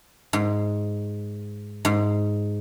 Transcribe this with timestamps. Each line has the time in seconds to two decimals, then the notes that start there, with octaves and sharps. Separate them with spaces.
0.33 G#2
1.85 G#2